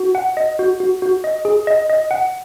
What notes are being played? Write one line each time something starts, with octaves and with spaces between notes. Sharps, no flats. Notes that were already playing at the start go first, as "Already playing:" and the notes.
Already playing: F#4
F#5
D#5
F#4
F#4
F#4
D#5
G#4
D#5
D#5
F#5